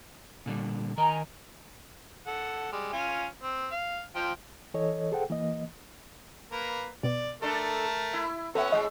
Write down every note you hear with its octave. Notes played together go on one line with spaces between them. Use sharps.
A#2 D3 G3
D#3 A#4 D#5 G#5 A#5
A4 F#5
G3 G#3
C#4 F4 G#5
C4
F5
F3 F4 G5
E3 A4 C#5 D#5
G#4 A4 C5 F#5 G5
E3 A#3 D#5
A#3 B4
B2 B3 D5
A3 D4 A4 A#4 A5
E4
B3 C#4 F#4 A4 C#5 E5
A2 G#3 D#5 F#5